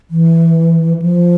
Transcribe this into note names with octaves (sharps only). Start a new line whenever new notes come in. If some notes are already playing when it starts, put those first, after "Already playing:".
E3
F3